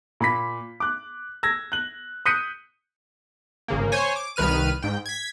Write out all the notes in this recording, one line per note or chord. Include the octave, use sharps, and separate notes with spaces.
A#2 B5 B6
D6 F#6
E6 G#6 A#6
F#6 F#7
D#6 F#6 G6 B6 C#7 D#7
G#1 C#3 A#3
C5 C#5 G#5
D6
C2 D#3 B4 F6 D#7
G#2 G5
G#6 B6